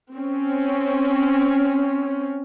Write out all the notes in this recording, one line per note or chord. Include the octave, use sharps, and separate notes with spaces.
C4 C#4